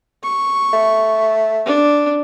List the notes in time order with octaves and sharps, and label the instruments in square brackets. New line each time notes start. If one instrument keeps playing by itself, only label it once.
[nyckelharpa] C#6
[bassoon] A3
[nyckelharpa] D4